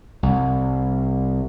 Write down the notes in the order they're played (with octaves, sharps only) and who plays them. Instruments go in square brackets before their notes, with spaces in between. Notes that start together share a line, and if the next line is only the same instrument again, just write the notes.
[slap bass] C2